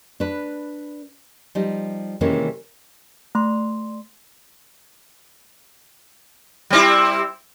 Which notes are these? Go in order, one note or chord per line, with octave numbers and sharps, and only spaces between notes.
D4 B4
F3 G3 D#4
C3 D#3 E3 G#3 A#3 C#4
A3 C6
G3 C4 E4